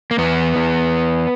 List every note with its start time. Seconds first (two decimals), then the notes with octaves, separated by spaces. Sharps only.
0.11 A#3
0.18 E2 B3
0.56 E2